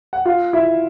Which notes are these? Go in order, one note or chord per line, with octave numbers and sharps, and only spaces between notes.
F#5
F4 F5
E4 E5